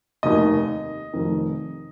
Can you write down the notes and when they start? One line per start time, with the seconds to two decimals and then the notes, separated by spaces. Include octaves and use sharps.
0.23 F1 D#2 D#3 D#5
1.13 F1 F2 D#3